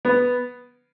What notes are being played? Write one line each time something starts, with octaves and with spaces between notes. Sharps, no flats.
B3